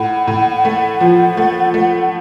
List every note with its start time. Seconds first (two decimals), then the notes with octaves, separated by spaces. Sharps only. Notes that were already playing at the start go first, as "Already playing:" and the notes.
Already playing: A2 F#5
0.27 A2
0.65 A3
1.01 F3
1.37 A3
1.74 A3